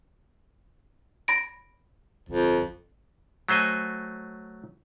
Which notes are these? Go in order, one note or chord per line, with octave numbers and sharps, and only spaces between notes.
B5 A#6 D7
G1 F2
F#3 A3 C5 D#5 G#5